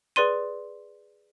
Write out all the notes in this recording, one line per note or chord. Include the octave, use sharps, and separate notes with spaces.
G#4 B4 D5 C6 D#7